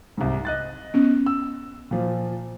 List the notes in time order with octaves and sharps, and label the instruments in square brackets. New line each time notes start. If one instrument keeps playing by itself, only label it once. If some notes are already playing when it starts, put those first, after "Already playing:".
[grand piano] C2 G#2
D#5 F#6 A6
[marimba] B3 C#4
[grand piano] E6
A#2 F3